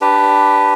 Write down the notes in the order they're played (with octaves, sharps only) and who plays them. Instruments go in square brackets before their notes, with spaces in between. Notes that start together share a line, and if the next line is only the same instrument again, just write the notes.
[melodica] D4 G4 B4